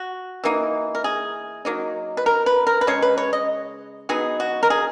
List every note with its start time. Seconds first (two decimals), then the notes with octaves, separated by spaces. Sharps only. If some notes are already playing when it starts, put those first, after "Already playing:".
Already playing: F#4
0.44 E3 A#3 D#4
0.95 A#4
1.04 G#4
1.65 F#3 A#3 D#4
2.17 B4
2.26 A#4
2.46 B4
2.67 A#4
2.81 B4
2.87 C#3 G#3 C#5
3.02 B4
3.18 C#5
3.33 D#5
4.09 F#3 B3 D#4 G#4
4.40 F#4
4.63 A#4
4.70 G#4